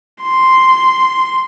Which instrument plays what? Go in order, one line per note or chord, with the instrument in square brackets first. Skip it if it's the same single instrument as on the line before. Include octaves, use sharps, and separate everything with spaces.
[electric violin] C6